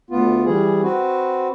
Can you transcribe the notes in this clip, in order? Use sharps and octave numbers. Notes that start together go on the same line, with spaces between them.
D2 B3 F4
E3 G3 G#4
C4 F#4 B4